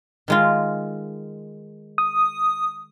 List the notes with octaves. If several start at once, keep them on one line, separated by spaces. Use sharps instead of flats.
D#3 G#3 F4
D#6